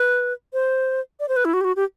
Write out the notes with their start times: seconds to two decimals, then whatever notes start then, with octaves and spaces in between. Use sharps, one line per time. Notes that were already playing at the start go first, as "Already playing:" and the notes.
Already playing: B4
0.53 C5
1.20 D5
1.29 C5
1.36 B4
1.45 E4
1.54 F#4
1.61 G4
1.64 F#4
1.76 G4